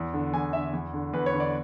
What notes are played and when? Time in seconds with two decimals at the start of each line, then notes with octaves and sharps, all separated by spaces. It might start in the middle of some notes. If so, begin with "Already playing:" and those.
Already playing: E2
0.14 D3
0.34 E2 G#5
0.53 D3 E5
0.73 E2
0.93 D3
1.13 E2 B4
1.26 C#5
1.33 D3
1.40 D5